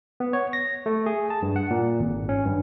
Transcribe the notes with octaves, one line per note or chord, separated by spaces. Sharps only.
B3
C#5
A#6
A3
G#4
A5
G2
F#5
A#2
G#1
C#4
G2